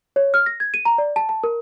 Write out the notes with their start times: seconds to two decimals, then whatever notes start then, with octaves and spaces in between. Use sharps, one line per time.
0.16 C#5
0.34 F6
0.46 A#6
0.60 G#6
0.74 D#7
0.85 A#5
0.98 D5
1.16 A5
1.29 A5
1.44 A#4